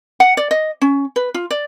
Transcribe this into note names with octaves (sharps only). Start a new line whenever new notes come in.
F#5
D5
D#5
C#4
B4
F4
D5